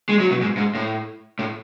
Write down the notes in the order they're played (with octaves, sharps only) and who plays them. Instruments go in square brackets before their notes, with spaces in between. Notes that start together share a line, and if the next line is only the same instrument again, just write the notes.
[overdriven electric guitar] G#3
F#3
B2
G#2
G#2
A2
A2